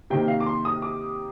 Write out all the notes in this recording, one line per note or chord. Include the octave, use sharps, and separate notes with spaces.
C3 D#3 A#3 G5
F5
D6
C6
D#6
D6